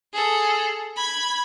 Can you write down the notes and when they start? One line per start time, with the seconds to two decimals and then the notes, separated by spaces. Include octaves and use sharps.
0.13 G#4 A4
0.96 B5 G#6